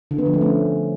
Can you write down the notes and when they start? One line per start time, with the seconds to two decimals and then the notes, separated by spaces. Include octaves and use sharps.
0.11 D3
0.18 B3
0.26 F3
0.34 A3
0.41 C#4